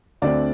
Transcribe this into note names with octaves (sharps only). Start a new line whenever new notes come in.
D2 D3 A3 C4 D4 D5